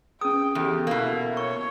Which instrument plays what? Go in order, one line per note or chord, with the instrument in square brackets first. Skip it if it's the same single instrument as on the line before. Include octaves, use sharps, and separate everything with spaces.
[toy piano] C#4 D#6 [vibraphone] G#4 [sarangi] G5
[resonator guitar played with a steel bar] E2 [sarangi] G4 [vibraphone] A4
[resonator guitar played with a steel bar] B2 A#3 [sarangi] E4
[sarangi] C#5 [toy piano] C#6